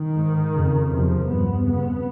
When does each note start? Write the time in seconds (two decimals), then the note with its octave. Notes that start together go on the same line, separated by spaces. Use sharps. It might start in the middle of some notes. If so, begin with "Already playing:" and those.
Already playing: D#3
0.16 G#2
0.54 F2 C#3
0.90 E2 C3 F3
1.28 G2 B3
1.65 F2 C#3 B3